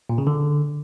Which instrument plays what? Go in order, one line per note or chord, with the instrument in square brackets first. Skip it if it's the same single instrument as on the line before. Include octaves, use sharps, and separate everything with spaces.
[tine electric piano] A#2
C#3
D3